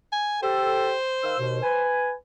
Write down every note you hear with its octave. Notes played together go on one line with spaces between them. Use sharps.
G#5
G4 A4 C5
D#3 F5 E6
D#2 B2
B4 G#5